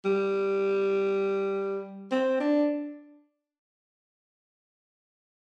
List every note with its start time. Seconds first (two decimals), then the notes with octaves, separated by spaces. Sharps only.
0.05 G3
2.11 C4
2.40 D4